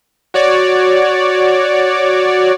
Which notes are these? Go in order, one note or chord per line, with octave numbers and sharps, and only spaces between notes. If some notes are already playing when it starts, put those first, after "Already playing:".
F#4 C#5 D5